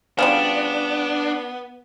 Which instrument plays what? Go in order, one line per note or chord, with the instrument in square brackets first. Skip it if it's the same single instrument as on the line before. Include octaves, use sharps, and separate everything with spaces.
[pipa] C#3 F3 G3 [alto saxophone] B3 [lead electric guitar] D4